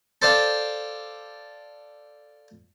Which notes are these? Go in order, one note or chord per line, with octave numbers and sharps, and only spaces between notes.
A4 C5 D5 F5 G5